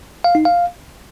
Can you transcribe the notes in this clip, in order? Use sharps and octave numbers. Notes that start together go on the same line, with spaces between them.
F5
D#4
F5